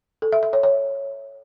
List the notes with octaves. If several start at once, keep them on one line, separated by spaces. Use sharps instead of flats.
A4
E5
E5
C#5
C#5